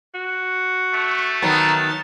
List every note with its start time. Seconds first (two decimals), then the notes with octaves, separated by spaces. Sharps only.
0.14 F#4
0.94 A3
1.42 D#3 F#3 B3 A5